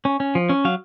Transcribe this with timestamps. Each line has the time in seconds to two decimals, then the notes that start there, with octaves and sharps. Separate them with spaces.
0.05 C#4
0.20 C#4
0.35 F3
0.49 C#4
0.65 F#3 F5